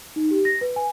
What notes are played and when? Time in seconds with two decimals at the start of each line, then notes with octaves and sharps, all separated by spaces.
0.16 D#4
0.31 G4
0.45 A#6
0.61 B4
0.76 G#5